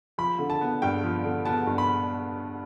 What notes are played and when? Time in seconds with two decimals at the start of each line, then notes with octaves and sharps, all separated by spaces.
0.18 F3 B5
0.39 D3
0.50 A5
0.61 B3
0.82 G2 G5
1.04 F3
1.24 D3
1.45 B3 A5
1.67 G2
1.78 B5